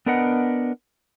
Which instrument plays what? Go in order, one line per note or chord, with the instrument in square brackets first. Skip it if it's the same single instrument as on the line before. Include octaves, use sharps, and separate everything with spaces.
[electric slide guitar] B3 D4 A#4 B4 D#5 F#5